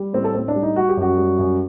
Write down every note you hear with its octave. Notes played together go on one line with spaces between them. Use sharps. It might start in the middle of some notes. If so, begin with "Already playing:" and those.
Already playing: G3
A2 C4
A4
A2 C4
D4
G3
D#4
G3 F#4
G4
F#2 F#4
G3
F#2